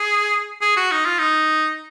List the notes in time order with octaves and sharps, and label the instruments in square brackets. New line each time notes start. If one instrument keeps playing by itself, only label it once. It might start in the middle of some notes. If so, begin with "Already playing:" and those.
Already playing: [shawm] G#4
G#4
F#4
D#4
F4
D#4